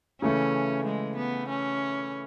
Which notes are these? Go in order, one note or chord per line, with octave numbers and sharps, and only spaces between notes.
C#3 E3 A3 C#4
G#3
B3
C#4